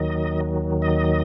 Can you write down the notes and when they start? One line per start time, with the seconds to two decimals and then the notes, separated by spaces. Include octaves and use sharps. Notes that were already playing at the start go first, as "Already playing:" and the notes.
Already playing: D#2 D#3 F#3 D#5
0.82 D#5